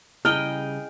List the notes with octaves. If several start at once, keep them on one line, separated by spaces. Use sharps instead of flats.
C#3 G3 E4 G#4 D#5 G5 F6